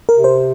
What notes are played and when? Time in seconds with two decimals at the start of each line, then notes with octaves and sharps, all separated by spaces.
0.09 A#4
0.16 C3
0.24 C5